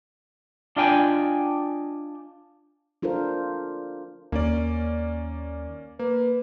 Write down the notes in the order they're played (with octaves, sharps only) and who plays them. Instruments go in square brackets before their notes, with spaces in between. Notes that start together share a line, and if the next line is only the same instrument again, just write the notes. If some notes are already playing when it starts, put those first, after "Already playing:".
[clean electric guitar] D4 F4 D#5 G5 G#5
[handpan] D4 F4 A4 A#4 C5
[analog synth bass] D#2 [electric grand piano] A#3 C#4 D5
[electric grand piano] A#3 [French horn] B4